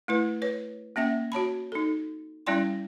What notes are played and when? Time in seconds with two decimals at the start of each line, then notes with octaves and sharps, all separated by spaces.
0.08 A3 E4 B4
0.42 B4 C#5
0.96 A#3 C#4 E5 G5
1.32 F#4 C#5 A5 B5
1.72 D#4 A4
2.46 G3 C#4 E4 D5 G5 C6